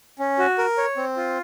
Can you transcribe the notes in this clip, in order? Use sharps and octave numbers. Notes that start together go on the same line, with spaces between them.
C#4
F#4
A#4
C#5
C4
F4